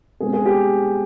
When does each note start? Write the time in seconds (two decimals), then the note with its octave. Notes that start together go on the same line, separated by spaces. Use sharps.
0.20 B2 G#3 C4 G#4
0.33 G#4
0.46 G4